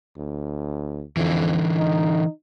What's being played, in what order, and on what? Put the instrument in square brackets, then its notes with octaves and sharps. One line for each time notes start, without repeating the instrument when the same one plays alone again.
[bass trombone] D2
[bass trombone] F2 [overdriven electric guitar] D3 E3
[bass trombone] D#4